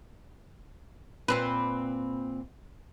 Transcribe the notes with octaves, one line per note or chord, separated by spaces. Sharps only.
A#2 C4 B4